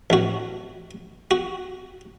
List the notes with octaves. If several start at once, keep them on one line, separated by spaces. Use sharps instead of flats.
A1 F#4
F#4